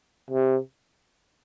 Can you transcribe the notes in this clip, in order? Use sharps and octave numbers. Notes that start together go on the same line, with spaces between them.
C3